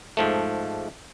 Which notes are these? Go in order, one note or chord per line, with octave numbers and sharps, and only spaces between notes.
G#2 F3 A3